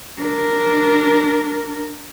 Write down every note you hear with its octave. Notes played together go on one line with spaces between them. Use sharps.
D4 A#4